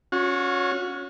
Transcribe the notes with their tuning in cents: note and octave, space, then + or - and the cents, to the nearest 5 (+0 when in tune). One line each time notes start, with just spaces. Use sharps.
C#4 +5 F#4 -35